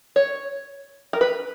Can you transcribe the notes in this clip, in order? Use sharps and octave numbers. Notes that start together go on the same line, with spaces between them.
C#5
A#4
B4